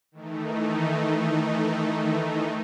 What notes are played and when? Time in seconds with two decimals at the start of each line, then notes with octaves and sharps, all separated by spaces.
0.12 D#3 E3 A3 D#4